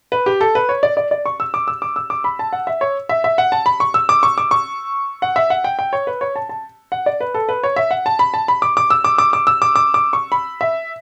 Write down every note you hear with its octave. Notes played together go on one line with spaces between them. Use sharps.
B4
G4
A4
B4
C#5
D5
D5
D5
C#6
E6
D6
E6
D6
E6
D6
B5
A5
F#5
E5
C#5
E5
E5
F#5
A5
B5
C#6
E6
D6
C#6
D6
C#6
F#5
E5
F#5
G5
G5
C#5
B4
C#5
A5
A5
F#5
D5
B4
A4
B4
C#5
E5
F#5
A5
B5
A5
B5
D6
D6
E6
D6
D6
D6
E6
D6
D6
D6
C#6
B5
E5